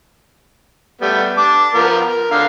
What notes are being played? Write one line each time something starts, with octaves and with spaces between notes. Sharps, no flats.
G3 A3 B3
A5 D6
F3 B3 A#4
A#4
D3 F5